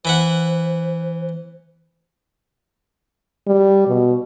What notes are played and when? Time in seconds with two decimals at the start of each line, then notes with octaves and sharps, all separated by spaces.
0.05 E3 C5 E5 F#5
3.47 G3
3.88 B2